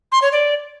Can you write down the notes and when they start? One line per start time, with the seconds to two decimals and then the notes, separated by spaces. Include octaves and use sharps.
0.12 C6
0.22 C#5
0.32 D5